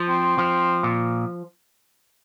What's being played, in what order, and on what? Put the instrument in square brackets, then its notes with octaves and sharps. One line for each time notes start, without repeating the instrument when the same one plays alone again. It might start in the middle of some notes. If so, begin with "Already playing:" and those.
Already playing: [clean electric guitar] F3
[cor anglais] C4
[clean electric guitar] F3
A#2